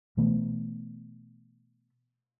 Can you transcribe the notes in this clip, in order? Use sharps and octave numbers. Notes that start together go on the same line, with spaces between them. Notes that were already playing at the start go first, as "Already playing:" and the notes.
B2 E3 A3 B3